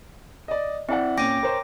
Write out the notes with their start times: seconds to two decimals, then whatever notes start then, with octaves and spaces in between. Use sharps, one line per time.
0.48 D5 D#5
0.89 C4 E4 D5 F#5
1.18 A#2 C#4 G5 D6 A#6 D#7
1.42 A#4 C5 C#5